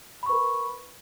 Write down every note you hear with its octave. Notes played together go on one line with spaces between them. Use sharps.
A#4 B4 B5 C#6